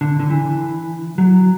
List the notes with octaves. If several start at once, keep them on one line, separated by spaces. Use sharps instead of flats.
D3
D3
E3
F#3